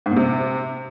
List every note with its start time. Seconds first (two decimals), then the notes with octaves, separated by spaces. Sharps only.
0.06 G#2
0.11 A#2
0.16 C3